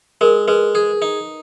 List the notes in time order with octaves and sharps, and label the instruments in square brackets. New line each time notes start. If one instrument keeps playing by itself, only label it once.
[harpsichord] G#3 [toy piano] A#4
[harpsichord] G#3 [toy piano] B4
[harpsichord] G#4
D#4